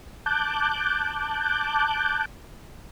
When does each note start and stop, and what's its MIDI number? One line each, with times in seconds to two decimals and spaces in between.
0.26 2.25 81
0.26 2.25 86
0.26 2.25 90
0.26 2.25 91